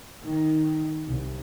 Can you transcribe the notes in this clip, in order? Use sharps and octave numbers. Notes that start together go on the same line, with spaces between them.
D#3
C2